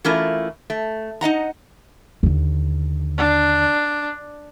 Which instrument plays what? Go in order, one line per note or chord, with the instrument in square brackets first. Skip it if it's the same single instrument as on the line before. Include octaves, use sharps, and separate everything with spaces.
[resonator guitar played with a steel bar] E3 A3 C#4 E4 F4 A#4
A3
D#4 D#5 F#5 A#5
[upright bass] D#2 D3
[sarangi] D4